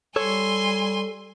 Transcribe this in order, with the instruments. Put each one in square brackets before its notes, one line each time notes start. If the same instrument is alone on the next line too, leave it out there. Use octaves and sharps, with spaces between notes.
[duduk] G3 [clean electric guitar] A4 C#5 [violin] G#5 C6